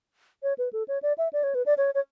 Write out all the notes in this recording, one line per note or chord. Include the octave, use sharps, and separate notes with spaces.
C#5
B4
A4
C#5
D5
E5
D5
C#5
B4
D5
C#5
C#5